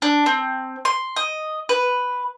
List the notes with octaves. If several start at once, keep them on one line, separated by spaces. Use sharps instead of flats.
D4
C4
C6
D#5
B4